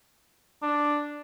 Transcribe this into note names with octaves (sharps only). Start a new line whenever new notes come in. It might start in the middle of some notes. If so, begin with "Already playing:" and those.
D4